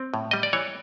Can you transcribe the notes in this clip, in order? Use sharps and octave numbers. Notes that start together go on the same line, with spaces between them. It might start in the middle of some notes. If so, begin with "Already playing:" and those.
Already playing: C4
A2
G3 D#5
D5
E3 C#5